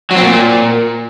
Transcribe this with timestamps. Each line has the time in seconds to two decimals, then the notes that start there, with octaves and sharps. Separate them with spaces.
0.11 F#3
0.16 C4
0.22 A#2